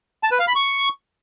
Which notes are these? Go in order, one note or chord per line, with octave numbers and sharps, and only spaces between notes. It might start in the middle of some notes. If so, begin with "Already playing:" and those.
A5
B4
F5
B5
C#6